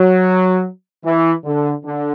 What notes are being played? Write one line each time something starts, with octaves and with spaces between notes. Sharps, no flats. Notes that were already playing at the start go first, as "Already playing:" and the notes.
Already playing: F#3
E3
D3
D3